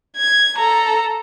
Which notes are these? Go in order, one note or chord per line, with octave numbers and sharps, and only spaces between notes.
G#6
A4 A#5